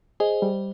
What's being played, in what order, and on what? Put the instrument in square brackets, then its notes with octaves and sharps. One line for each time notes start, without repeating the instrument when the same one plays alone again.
[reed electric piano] G#4 [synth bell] C5 D#5
[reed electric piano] G3